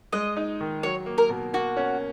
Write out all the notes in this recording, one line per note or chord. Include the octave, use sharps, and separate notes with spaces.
G#3 D#5
D#4
D#3
F#3 C#5
A#3
A#4
B2
A#3 F#4
C#4